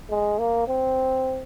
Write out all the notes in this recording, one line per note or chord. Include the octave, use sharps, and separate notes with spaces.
G#3
A#3
C4